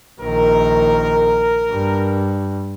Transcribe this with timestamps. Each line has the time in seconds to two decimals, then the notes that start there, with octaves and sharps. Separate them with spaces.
0.21 A#1 D#3 A#4
1.71 G2